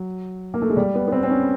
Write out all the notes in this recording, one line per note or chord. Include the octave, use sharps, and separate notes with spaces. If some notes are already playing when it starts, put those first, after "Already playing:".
Already playing: F#3
A#3
A3
G#3
G3
B3
B3
C4
C4
C#4